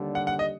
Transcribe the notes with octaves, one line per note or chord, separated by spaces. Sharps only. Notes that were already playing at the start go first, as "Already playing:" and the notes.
Already playing: D#2 D3 G3
F#5
F#5
D#5